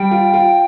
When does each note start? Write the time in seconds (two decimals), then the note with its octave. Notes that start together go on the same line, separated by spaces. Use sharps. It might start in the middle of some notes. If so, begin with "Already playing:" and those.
Already playing: G3 G5
0.11 F4
0.34 F4